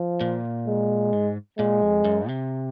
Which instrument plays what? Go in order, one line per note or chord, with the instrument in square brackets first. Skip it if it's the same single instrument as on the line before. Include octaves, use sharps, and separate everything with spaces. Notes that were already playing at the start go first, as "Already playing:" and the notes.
Already playing: [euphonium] F3
[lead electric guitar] A#2
[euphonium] G#3
[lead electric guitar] G#2
[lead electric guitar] A#2 [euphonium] G#3
[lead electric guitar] F2
F#2
C3